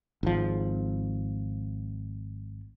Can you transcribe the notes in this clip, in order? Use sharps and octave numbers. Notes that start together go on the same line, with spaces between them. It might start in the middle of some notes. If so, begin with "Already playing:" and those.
G#1 F3